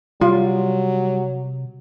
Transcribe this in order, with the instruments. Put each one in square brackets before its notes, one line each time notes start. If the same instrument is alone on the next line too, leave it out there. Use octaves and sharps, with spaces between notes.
[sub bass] C3 [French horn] F#3 [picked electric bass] G3 [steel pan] F4